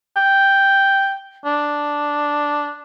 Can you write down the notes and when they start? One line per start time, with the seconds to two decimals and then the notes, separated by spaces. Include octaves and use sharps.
0.16 G5
1.45 D4